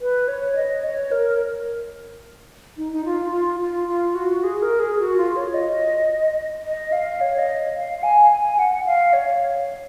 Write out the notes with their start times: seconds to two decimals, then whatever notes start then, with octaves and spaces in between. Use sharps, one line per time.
0.01 B4
0.28 C#5
0.55 D#5
0.84 C#5
1.11 A#4
2.77 D#4
2.93 D#4
3.05 F4
3.32 F4
3.60 F4
3.88 F4
4.15 F#4
4.44 G#4
4.62 A#4
4.79 G#4
4.99 F#4
5.17 F4
5.36 C#5
5.54 D#5
6.65 D#5
6.92 F5
7.21 C#5
7.38 D#5
7.75 F5
8.03 G#5
8.31 G#5
8.59 F#5
8.86 F5
9.13 C#5